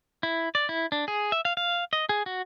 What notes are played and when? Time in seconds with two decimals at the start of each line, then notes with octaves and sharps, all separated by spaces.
0.23 E4
0.55 D5
0.69 E4
0.92 D4
1.08 G#4
1.32 E5
1.45 F5
1.57 F5
1.93 D#5
2.09 G#4
2.26 F#4